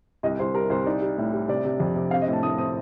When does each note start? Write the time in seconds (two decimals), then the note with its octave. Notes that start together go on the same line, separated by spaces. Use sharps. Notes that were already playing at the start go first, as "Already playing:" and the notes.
0.23 C2 D#5
0.39 C2 C5
0.55 G3 A#4
0.70 C2 C5
0.86 D#4 D5
1.02 G3
1.18 A2
1.33 G3
1.48 C3 D5
1.65 C3
1.80 F2
1.95 C3
2.11 C4 F5
2.22 D#5
2.28 A2
2.33 A5
2.43 A2 D#6
2.58 C4 D#6